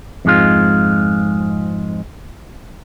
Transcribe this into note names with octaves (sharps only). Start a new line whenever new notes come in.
F2 G#2 G#3 F4